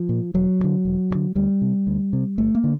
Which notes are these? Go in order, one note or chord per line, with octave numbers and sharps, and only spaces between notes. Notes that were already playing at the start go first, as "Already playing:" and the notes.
Already playing: F3
A#2
E1 F#3
D2
D3
E1
D2
D3
D2 G3
C3
D2
C3
G1 A3
A#3
D3